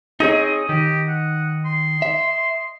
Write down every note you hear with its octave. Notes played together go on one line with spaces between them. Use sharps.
C4 D#4 G#4 C#5 D#5
D#3 G4
F#5
C6
E5